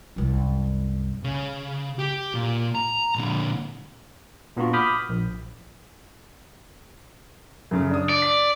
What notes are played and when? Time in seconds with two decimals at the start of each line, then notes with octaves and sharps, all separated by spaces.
0.16 C2 F#2
1.24 C#3
1.99 G4
2.34 A#2
2.75 A#5
3.16 A#2 D3
4.57 A#2 B3 D4 F4 F#4
4.73 B5 D6 D#6 F6 G6 B6
5.09 A#1
7.71 F#2 C#3
7.91 D4 D#6
8.09 D5
8.22 B6